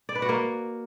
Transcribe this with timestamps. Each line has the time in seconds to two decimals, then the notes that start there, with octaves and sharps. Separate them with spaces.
0.09 D5
0.15 B4
0.22 F#4
0.29 A#3